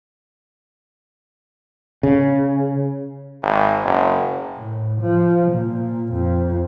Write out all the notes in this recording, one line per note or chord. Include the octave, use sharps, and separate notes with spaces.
C#3
G#1
F#1
A2
F3
A#2
F2